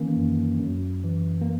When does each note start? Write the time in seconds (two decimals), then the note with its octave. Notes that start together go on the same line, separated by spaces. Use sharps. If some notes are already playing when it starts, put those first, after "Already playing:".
Already playing: D#3 E3 A#3 C#4
0.17 F#2
0.60 F#2
1.04 E3
1.41 A#3